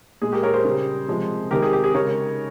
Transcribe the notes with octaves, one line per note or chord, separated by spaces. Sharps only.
A#2 G#3 G#4
G4 A#4
A#4 C#5
G#4 C5
C#3 G3
C3 F3 G#3
C3 D#3 G#3 G4 A#4
G#4
G4
G#4
C#3 G#3 A#4 C#5